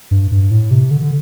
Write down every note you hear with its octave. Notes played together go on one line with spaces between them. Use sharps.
G2
G2
A2
C3
D3
D3